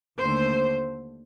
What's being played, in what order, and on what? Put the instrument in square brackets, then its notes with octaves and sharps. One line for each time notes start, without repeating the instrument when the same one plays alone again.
[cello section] D#2 D3 A3 C5